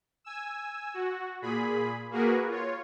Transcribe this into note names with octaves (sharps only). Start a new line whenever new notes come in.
G#5 E6
F#4
A#2 G#4 B5
A#3 F#4 G#4 A#4 B4
F4 C#5